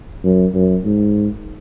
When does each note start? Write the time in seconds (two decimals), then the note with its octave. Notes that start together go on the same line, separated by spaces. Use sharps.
0.24 F#2
0.54 F#2
0.85 G#2